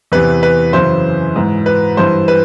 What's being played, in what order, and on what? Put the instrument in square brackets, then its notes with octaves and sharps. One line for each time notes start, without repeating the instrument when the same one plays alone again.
[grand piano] E2 C3 E3 B4
B4
F#2 C#3 E3 C5
G#2 E3
B4
G2 E3 C5
B4